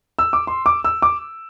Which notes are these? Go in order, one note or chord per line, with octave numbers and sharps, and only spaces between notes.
E6
D6
C6
D6
E6
D6